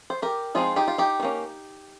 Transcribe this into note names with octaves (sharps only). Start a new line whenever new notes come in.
C5
G4 A#4
F3 G#3 C4 D#4 F4 G#4
D#4 G4
F4
D#4 G4
D#3
A#3 C#4